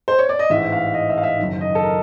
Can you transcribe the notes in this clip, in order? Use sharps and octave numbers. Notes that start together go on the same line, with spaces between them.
C5
C#5
D5
D#5
A1 G#2 E3 E5
F5
D#5
E5
F5
E5
F#1 F#2 D#3
D#5
A4
A#4